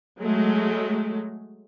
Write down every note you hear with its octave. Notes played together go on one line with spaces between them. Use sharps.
F#3 G#3 A3